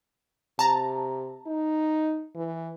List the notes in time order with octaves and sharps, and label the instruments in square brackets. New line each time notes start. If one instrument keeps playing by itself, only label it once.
[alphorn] C3 [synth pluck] A5 A#5
[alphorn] D#4
E3